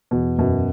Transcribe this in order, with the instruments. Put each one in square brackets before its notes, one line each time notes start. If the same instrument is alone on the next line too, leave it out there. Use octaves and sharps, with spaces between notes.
[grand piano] E2 [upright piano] B2
[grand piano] F#2 [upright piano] B2